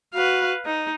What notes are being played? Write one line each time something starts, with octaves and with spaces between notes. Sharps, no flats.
F#4 B4 F5
D#4 D#5